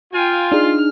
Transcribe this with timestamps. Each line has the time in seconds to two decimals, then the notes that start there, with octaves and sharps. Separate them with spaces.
0.13 F4 G5 G#5
0.52 D4 D#4 G#4 F6